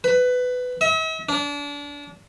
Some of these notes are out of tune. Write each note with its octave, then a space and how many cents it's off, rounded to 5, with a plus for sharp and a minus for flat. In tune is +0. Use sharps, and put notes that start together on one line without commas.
B4 +15
E5 -45
D4 -30